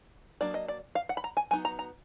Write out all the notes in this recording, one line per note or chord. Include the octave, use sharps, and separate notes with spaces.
F#3 A#3 D4 D5
D#5
D5
F5
F#5
B5
A#5
G#5
F#3 B3 D#4 G#5
A#5
A#5